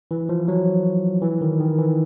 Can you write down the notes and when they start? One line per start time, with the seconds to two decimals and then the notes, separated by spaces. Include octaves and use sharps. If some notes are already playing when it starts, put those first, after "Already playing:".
0.11 E3
0.29 F3
0.48 F#3
1.22 E3
1.41 D#3
1.60 D#3
1.79 E3